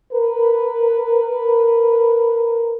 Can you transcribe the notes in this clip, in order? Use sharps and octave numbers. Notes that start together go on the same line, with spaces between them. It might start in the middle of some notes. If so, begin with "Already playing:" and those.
A#4 B4